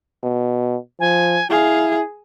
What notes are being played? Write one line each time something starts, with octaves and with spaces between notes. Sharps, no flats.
B2
F3 G#5
E4 G#4 F5